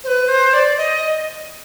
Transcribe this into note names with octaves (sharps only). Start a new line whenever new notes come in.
C5
B4
C5
D5
D#5